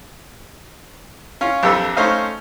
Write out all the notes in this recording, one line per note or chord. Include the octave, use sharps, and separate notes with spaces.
C#4 F4
A#1 F2 G4 A4 B4 E6
A3 C#4 D#4 C5 D#5 F5